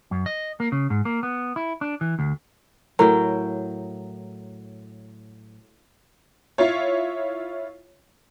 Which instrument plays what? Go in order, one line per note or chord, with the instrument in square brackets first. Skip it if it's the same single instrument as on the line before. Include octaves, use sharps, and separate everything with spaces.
[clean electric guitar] F#2
D#5
A#3
C#3
G#2
A#3
B3
E4
D4
E3
D2
[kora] A2 F#3 G5 [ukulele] A#4
[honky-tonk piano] E4 F4 C#5